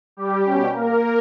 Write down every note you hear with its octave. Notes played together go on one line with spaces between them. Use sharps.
G3 G4
B2 G3 C#4
A#3 A#4